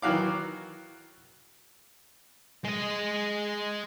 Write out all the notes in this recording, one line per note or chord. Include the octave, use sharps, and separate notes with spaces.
D#3 E3 F#3 F#4 F5 D6
G#3 D#5